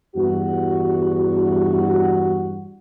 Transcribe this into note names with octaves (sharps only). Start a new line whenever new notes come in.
E2 G2 F#4